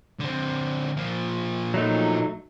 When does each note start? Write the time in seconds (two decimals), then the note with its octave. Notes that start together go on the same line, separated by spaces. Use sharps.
0.20 D3 C4
0.97 A#2 F3
1.74 F#3 A3 D#4